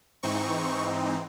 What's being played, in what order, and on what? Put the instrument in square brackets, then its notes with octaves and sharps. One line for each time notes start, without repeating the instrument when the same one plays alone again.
[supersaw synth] G#2 E3 C4 D#4 C#6